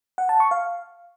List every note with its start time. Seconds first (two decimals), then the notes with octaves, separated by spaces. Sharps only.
0.18 F#5
0.29 A5
0.40 C#6
0.51 F5